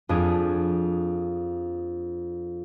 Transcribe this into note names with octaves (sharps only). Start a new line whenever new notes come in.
F2 D4 G#4